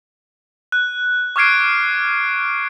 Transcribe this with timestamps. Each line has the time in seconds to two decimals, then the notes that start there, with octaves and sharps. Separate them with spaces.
0.72 F#6
1.36 C#6 D6 F6 G#6 C7 D7